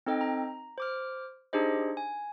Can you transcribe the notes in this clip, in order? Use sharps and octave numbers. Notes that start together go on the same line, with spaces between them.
C4 D#4 A4 D#5 G5
A#5
C5 D6 F6
D4 D#4 G4 G#4 C5 D#5
G#5